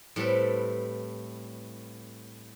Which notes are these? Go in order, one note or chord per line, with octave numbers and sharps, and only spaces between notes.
A2 G3 C4 A4 B4